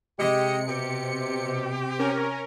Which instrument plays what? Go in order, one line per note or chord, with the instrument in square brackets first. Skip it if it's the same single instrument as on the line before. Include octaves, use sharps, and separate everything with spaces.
[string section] C3 [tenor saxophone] G#3 [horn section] G4 D#5 [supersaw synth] C#7
[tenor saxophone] B2 [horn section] C4 G4
[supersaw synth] C#4 A#4